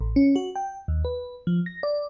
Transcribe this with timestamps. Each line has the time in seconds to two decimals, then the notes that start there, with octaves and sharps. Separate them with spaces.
0.01 A1
0.16 C#4
0.36 F#4
0.56 G5
0.88 D#2
1.05 B4
1.47 F3
1.66 A#6
1.83 D5